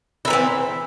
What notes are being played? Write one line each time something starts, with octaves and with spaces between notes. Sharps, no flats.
D#3 E3 C4 E4